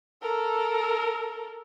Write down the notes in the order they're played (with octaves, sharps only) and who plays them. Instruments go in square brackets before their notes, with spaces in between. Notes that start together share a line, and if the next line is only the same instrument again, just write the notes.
[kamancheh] A4 A#4